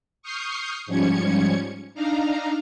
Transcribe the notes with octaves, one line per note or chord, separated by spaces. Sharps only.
C#6 D#6 F6 G6 C7
G#2 F3 G3 C#4 G#6 C#7
D4 D#4 F5 A#5